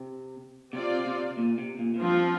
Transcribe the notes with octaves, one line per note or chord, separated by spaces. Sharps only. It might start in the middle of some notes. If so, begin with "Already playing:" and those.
Already playing: C3
C3 C4 F4 D5
C3
A#2
C3
A#2
A#2
G2 F3 C4 F4